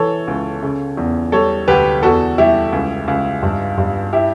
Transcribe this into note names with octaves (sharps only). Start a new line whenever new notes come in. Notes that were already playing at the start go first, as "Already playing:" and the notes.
Already playing: E3 A4 C#5
C#2
C#3
E2
G3 A4 C#5
D2 G4 B4
E2 F#4 A4
G3 E4 G4
C#2
C#2
G2
G2
E4 G4